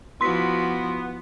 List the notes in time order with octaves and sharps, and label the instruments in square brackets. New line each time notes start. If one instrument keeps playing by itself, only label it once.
[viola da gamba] F3 E4 F#4 [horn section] B3 [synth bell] C6 B6